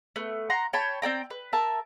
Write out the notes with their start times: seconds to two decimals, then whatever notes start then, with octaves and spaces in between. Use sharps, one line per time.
0.16 A3 B3
0.50 F#5 A#5 C6
0.73 C#5 G5 A5 B5
1.02 C4 D5 G5 A#5
1.30 B4
1.53 A#4 E5 A5